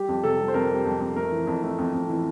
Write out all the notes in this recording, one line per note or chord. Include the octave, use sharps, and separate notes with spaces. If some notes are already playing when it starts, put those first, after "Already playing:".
Already playing: G3 G4
F2
C3 A4
G3
C5
F2 A#4
G3
F2
F2
A3 A#4
E3
F2
A3
F2
F2
E3